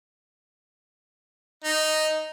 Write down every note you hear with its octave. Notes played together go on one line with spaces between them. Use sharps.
D#4